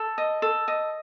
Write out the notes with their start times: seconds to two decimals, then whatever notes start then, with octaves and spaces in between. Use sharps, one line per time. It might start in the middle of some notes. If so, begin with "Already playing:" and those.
Already playing: A4
0.18 D#5
0.42 A4
0.68 D#5